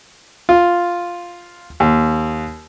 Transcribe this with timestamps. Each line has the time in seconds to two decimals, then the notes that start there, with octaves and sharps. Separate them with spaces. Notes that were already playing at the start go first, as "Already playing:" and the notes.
0.49 F4
1.80 D#2